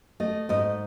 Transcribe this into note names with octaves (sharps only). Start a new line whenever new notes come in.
A3 D#5
G#2 D#5